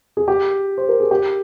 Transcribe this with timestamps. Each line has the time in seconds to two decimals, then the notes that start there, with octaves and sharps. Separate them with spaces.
0.17 G#4
0.28 G4
0.77 C5
0.89 A#4
1.00 G#4
1.11 G4